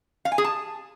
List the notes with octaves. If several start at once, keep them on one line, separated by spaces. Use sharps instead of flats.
F5
G#5
G#4
A5